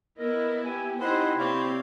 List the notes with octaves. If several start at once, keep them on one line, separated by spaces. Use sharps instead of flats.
B3 E4 A#4 D#5
G4 G#5
C4 D#4 E4 G4 C5 D#5 F#5 G#5
C3 C4 G4 C#5 D5 F5